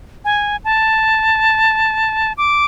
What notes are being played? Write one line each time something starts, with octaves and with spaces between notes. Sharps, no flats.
G#5
A5
D6